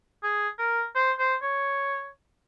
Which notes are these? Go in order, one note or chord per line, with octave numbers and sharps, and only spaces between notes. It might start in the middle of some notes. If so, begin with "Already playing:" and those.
G#4
A#4
C5
C5
C#5